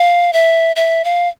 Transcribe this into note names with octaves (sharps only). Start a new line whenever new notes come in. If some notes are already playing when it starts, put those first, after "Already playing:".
Already playing: F5
E5
E5
F5